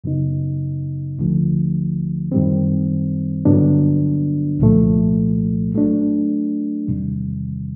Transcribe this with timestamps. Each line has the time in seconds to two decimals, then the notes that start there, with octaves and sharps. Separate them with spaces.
0.04 F#2 C#3 F#3 B3 D#4
1.18 D2 D3 F3 A3
2.32 F#2 D#3 G3 C4
3.45 G2 D3 F#3 B3 D4
4.59 C2 A#2 F3 A3
5.74 F#3 A3 D4
6.88 E2 C3 D#3 G3